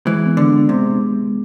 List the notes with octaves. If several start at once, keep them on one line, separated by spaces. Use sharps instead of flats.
E3 G#3
B3
D3
B3
C3 G#3